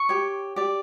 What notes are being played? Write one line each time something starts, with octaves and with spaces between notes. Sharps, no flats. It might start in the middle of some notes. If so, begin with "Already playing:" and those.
Already playing: C#6
G4 C#5
G4 D5